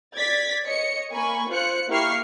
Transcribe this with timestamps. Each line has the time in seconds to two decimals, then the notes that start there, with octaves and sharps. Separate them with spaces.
0.15 D5 G#6 A6 B6
0.66 C#5 D#5 C#7
1.12 A#3 G#5 B5 C#6
1.50 F4 C5 F#6 C#7
1.89 A#3 E4 G4 C#6 F6 C7